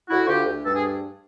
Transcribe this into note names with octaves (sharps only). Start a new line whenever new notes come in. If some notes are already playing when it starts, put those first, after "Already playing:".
D2 E4 F#4
D2 F4 G4
D2
G2 A4
G#4